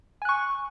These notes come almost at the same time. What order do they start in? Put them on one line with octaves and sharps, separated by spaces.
G#5 F#6 C#6